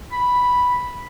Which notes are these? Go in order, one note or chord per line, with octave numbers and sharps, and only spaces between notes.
B5